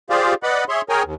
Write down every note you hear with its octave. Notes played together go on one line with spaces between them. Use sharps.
F4 G4 G#4 C5 D5 F5
B4 D5 D#5 F#5 B5
G#4 C#5 E5 C6
G#4 A#4 C#5 G5 G#5 A#5
D#2